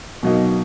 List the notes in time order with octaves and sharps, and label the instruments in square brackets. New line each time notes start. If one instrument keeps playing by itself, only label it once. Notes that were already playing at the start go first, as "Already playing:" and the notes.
[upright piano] B2 F#3 A#3 D#4